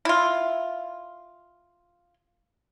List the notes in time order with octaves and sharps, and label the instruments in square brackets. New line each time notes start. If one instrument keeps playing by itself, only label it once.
[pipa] E4 F4